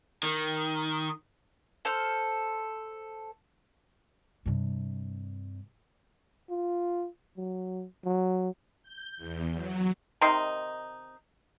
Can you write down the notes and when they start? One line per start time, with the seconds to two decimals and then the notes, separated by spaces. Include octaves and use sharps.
0.23 D#3
1.85 A4 C5 F6
4.46 G2 C3
6.50 F4
7.37 F#3
8.05 F#3
8.83 G6
9.17 E2
9.54 F#3
10.21 C3 D#3 D#4 C6